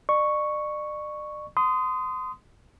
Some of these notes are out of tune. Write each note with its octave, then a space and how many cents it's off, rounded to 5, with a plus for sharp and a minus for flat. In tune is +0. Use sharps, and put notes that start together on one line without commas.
D5 +40 C#6 +0
C6 -30 D#6 +0